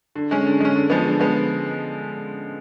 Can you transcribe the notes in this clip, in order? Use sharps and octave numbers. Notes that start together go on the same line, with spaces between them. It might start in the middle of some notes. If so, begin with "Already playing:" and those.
D3
G#3 C#4
D3
G#3 C#4
D3
F3 G#3 B3
D3
F3 G#3 B3